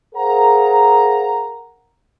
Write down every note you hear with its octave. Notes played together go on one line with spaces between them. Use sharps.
G#4 A#4 C5 F5 F#5 A#5